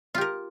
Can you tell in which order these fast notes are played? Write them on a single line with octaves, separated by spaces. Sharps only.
F4 G4 A#4